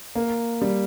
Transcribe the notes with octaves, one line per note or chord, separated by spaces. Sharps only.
A#3
G3